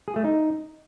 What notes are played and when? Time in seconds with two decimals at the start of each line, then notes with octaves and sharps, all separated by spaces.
0.08 G#4
0.16 A3
0.24 D#4